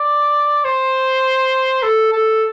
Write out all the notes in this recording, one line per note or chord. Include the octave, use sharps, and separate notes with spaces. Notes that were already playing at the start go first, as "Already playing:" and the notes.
Already playing: D5
C5
A4
A4